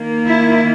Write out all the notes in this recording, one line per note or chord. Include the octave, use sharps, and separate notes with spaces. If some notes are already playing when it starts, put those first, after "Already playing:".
Already playing: D#3 A#3
E4